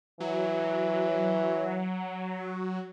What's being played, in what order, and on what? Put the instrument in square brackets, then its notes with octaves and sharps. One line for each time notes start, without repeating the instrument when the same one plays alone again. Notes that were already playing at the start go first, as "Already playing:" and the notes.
[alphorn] E3 [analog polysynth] F#3